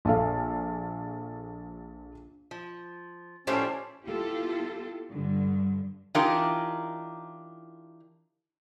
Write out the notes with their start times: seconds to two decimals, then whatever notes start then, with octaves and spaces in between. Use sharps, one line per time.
0.05 A#1 A4 F5
2.51 F3
3.47 A2 F3 C#4 E4 G4 C5 D5
4.05 B3 E4 F4 G4 A4
5.12 G2 D3
6.15 E3 D4 D#4 F4 G4 A#4